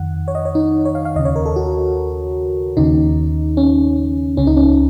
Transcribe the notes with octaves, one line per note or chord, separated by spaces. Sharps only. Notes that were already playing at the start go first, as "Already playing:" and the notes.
Already playing: F2 D#3 F#5
C#5
D#5
C#5
D#4
C#5
F5
F5
D#2 C#3 D#5
C#5
A#4
A4
F#4
D#2 C#3 D#4
C#4
C#2 C#3 C#4
D#4
C#4